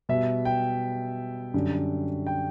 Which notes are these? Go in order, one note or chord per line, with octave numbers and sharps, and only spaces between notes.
B2 G3 E5
G5
F#2 D3 G3
G5